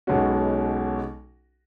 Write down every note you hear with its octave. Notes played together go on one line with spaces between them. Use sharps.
B1 B2 G#3 C#4 F#4